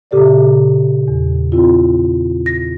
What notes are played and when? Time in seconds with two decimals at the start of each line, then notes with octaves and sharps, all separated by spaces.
0.11 A#2 C#3 G4 A4 D5
1.08 E2
1.52 C4 E4 F4
2.46 A#6